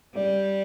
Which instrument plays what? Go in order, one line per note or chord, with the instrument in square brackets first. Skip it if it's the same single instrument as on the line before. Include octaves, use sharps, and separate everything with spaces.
[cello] G3 [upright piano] D5